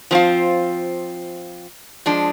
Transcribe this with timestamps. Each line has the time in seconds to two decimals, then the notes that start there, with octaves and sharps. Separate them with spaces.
0.11 F3 C4 F4
2.06 F3 G#3 D4